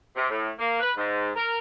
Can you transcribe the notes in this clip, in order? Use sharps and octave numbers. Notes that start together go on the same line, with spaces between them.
C3
A2
A#3
B4
G#2
A#4